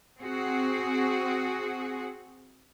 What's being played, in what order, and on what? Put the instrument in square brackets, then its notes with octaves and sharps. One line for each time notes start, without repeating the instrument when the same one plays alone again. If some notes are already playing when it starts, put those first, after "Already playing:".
[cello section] C4 F#4 G#4